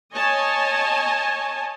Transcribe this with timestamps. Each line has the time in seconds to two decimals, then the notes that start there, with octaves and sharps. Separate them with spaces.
0.14 C#5 D#5 G#5 A5